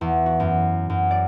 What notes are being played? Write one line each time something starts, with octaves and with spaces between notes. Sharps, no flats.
E2
F#4
F#2
F#2
D5